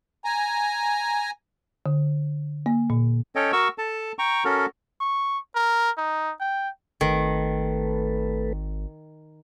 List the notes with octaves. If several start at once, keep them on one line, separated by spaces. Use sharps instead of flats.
G#5 A#5
D3
A#3
A#2
C#4 A4 C#5 D#5 G5
F#4 A#4 C#6 E6
A4 A5
G5 A#5 C#6
C#4 F#4 A4 A#4
C#6
A#4
D#4
G5
G#1 D#3 A3 A4 B4